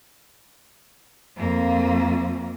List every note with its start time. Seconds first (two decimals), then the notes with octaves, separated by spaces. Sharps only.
1.37 F2 A#3